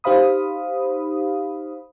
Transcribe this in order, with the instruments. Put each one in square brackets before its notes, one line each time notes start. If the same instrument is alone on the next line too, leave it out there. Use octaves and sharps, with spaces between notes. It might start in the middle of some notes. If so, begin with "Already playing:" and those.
[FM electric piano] D#4 G4 C5 F5 B5 D#6